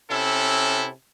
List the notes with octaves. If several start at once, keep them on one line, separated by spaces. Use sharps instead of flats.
C3 C#4 E4 A4